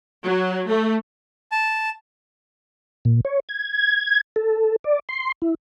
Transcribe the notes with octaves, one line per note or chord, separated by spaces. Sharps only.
F#3
A3
A5
A#2
C#5
G#6
A4
D5
C6
E4